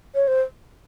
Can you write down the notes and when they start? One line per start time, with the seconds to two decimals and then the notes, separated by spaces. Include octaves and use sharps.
0.15 C#5
0.27 C5